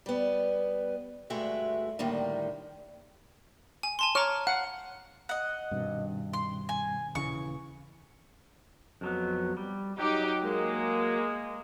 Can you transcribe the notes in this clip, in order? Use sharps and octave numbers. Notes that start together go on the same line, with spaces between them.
G3 B3
D2 G2 G#3 A3 F#4 E5
A2 D3 D#3 G3 A#3
G#5
G#5 A5 C6
C#5 A#5 C#6 D6 F6
F5 F#5
D#5 F#5
G2 B2 D#3 C4
C6
G#5
D#1 C#3 E3 C#6
F2 F#3 B3
G3
F#3 D#4 G4
G#3 A#3